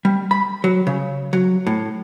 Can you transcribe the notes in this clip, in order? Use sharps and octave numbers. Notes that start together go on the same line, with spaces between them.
G3
B5
F#3
C#3
F#3
A2